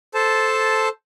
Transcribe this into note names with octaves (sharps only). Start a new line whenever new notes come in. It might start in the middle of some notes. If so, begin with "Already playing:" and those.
A4 C5 A5